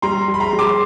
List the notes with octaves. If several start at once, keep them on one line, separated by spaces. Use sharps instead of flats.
G3 A#5 C6
G3
B5
A#5 C6
G3
C6 D6